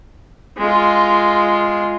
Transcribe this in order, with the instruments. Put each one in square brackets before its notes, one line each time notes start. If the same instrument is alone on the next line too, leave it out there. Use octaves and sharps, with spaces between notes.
[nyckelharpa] G#3 F4